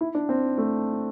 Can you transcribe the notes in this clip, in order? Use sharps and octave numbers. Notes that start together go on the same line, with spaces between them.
E4
D4
C4
A3